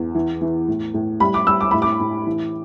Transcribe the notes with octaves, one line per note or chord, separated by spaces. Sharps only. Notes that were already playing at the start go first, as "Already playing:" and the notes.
Already playing: E2
E3
E3
A2
A2
G3 B5
D6
G3 E6
D6
A2 B5
D6
A2
E3